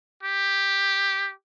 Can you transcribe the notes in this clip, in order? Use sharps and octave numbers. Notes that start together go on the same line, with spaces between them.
G4